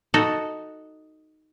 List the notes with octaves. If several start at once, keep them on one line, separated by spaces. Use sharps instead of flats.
D#4 F#4 A4